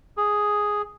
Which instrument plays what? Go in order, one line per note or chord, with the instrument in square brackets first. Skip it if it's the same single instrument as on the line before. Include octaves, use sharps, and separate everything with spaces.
[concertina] G#4